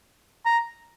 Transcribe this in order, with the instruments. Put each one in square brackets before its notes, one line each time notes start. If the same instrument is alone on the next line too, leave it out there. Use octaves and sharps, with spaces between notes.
[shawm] A#5